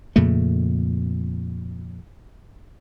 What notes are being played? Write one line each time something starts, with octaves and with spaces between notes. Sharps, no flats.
F2 A#2 C#3 A3